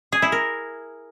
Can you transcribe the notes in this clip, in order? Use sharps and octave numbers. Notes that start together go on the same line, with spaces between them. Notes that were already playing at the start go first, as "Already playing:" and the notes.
G#4
E4
A#4